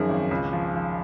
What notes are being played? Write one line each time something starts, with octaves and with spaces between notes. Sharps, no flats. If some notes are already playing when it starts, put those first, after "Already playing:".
Already playing: F#2 D#3 F3 G#4
G#1
C#2
F3
F3